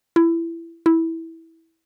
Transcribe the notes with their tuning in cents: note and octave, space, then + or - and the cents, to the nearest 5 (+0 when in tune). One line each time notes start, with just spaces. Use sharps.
E4 +20
E4 -10